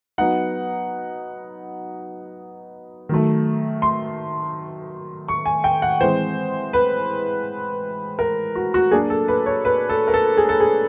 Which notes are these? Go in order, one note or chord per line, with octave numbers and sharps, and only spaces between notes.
F#3 B3 D#4 F#5
D#3 F#3 A3
C6
C#6
G#5
G5
F#5
E3 G#3 C4 C5
B4
A#4
F#4
F#4
F#3 A#3 D4 G#4
A4
B4
C#5
B4
A4
A#4
A4
G#4
A4
G#4